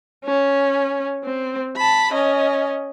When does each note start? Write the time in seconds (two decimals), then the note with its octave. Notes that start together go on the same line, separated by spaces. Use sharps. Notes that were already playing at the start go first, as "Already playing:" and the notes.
0.25 C#4
1.24 C4
1.77 A5 B5
2.13 C#4 D#5